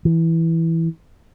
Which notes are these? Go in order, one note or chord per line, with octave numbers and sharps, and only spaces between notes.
E3